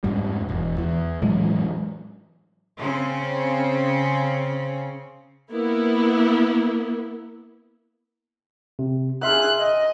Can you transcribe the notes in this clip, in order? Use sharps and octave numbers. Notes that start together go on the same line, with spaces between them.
F2 G#2 G3
E1
E2
A2 E3 F#3 G#3
C#3 C4 C#4
A#3 B3 E4
C3
G#4 E5 C6 F6 F#6
D#5